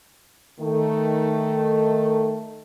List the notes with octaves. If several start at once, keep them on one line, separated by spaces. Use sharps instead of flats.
D#3 A3